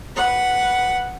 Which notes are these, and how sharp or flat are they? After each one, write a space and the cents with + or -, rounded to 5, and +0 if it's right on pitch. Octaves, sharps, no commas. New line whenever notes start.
B4 +0 F#5 +0